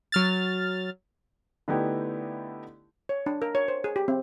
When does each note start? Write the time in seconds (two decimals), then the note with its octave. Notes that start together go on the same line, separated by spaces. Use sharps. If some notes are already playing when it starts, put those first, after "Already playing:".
0.12 F#3 F6 A6
1.68 D3 A3 B3 D#4 E4 G4
3.09 C#5
3.26 D4
3.42 A#4
3.55 C#5
3.68 C5
3.84 G#4
3.96 G4
4.08 C4